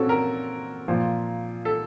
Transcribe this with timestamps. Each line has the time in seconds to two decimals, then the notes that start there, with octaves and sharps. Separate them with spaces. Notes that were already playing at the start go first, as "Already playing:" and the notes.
Already playing: A#2 C4 C#4 F#4 A4
0.09 A#4
0.88 A#2 F3
1.65 A4